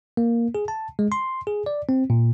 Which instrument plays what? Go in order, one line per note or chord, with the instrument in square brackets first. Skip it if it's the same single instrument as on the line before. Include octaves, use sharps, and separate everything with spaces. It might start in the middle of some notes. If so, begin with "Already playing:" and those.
[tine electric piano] A#3
G#4
A5
G#3
C6
G#4
D5
C4
A#2